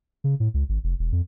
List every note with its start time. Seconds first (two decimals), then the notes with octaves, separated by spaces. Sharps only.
0.24 C#3
0.40 A2
0.54 C#2
0.69 G#1
0.84 F1
0.99 E1
1.12 F2